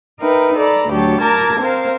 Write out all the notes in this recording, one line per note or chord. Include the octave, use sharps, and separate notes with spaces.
D#4 A#4 B4 E5 G5
A4 D5 A#5 B5
D2 F#3 G4 C#5 A5
A#4 A5 A#5 D6 G#6
C4 A#4 C5 F5